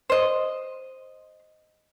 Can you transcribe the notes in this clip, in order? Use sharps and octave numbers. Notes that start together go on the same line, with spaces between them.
C5 D#5